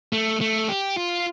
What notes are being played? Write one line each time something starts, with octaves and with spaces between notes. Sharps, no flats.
A3
A3
G4
F4